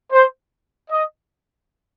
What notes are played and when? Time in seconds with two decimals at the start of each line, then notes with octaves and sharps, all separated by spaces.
0.12 C5
0.91 D#5